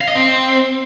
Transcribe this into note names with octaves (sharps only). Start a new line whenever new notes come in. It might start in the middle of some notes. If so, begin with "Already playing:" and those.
F5
D#5
C4